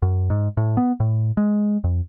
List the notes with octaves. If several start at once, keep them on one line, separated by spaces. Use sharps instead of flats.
F#2
G#2
A2
B3
A2
G#3
F2